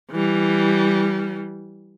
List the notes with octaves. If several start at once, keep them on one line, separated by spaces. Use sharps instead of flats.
E3 G3